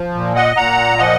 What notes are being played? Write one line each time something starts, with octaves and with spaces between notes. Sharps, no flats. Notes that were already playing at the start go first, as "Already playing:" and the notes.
Already playing: F3
A#2
D#5 F#5
A#2 F#5 A#5
F3 D#5 F#5